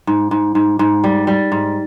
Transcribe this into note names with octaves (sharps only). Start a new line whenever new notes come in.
G#2
G#2
G#2
G#2
G3
G3
G#2